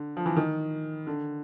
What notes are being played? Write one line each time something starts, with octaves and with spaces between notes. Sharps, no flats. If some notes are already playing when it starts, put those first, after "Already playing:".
Already playing: D3
F3
E3
D#3
D3